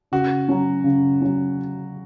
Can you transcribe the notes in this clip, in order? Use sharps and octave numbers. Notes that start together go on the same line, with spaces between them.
C#3 F#4
F#3 C#4
C#3
F#3 C#4